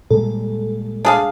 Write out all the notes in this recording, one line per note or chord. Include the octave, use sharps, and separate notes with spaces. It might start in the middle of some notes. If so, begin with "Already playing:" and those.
A#2 G3 G#3 A4
D4 G#4 F5